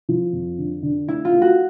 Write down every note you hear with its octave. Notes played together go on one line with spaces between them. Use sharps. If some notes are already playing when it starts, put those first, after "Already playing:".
F3
F2
D3
D3
A3 E4
F4
A3
F#4